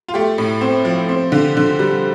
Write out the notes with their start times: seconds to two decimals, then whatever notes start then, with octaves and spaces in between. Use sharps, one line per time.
0.08 F4
0.14 A3 G4
0.38 A2
0.61 C4
0.85 F3
1.09 C4
1.32 D3
1.57 D3
1.79 G3